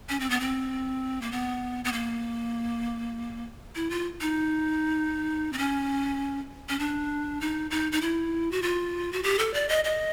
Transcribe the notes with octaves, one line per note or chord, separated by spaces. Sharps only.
C#4
C4
B3
C4
A#3
B3
B3
A#3
E4
F4
D#4
C4
C#4
C#4
D4
D#4
D#4
D#4
E4
F#4
F4
F#4
G4
A4
D5
D#5
D#5